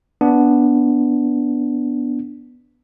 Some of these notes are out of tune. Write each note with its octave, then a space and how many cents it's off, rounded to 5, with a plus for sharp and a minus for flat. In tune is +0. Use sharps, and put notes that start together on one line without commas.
B3 -5 D4 -10